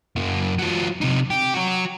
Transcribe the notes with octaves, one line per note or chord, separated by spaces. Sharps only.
F#2 A#3
F#3 F4
C3 D#4
G4
F#4 C#5